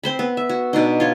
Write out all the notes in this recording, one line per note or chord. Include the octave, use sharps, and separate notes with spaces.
C4 C5 B5
B3
E5
F#4
B2 D4 D#4
F4 C#5